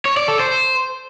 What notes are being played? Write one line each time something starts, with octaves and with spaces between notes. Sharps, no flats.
C#5
D5
A4
C5